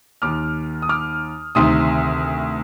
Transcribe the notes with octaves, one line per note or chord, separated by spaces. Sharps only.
D#2 D#3 D6 F6
D#6
D6 F6
D2 C3 D#3 C6 D#6